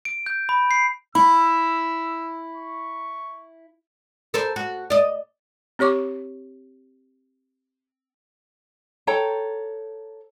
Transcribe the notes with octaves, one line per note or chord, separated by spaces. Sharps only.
D7
G6
B5
C7
E4 B5 E6
C#6
A4 A#4 C5
F#4
D5 D#5
C4 G4 C#5 C#6 D6
A4 C#5 G5 A#5